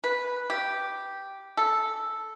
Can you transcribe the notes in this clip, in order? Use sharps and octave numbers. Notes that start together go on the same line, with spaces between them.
B4
G4
A4